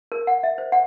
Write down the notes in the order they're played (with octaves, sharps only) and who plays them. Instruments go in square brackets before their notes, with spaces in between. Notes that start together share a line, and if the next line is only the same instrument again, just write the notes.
[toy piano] A#4
F#5
E5
C5
F#5